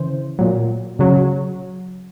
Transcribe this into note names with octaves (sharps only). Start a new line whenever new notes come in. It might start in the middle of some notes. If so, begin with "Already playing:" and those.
Already playing: C#3 E3 C5
A#2 F#3
C#3 F#3